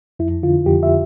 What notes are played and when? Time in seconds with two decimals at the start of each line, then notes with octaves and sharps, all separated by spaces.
0.19 F2 E4
0.43 D3 F4
0.66 F2 G4
0.83 E5